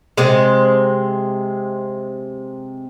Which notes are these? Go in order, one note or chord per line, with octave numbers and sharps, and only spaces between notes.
C3 G#3